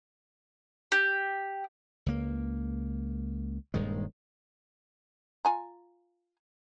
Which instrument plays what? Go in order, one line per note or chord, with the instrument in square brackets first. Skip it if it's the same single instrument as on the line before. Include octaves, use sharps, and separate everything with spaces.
[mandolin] G4
[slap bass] C#2 A#3
D#1 G2 D#3 G#3
[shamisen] F4 G#5 A#5